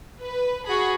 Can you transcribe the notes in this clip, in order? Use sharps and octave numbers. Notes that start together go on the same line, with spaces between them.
B4
F#4 G#4 B5